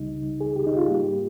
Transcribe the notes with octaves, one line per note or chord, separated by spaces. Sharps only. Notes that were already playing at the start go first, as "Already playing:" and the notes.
Already playing: C#2 C#3 G3 D#4
G#4
G4
D#4
F4
G#2 G3 A#3 G4